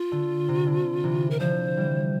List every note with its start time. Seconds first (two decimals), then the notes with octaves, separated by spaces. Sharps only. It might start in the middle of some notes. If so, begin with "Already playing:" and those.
Already playing: F4
0.12 D3
0.48 C3
0.67 D3
1.04 C3 E3
1.30 A#4
1.40 D3 F3 C5
1.77 E3 G3